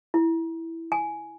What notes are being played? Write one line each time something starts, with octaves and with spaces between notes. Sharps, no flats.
E4
G#5